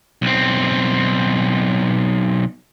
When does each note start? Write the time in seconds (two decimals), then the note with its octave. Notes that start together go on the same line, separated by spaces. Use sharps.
0.22 B1 C4